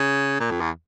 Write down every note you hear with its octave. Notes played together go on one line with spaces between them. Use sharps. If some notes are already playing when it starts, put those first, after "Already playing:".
Already playing: C#3
A#2
F2
E2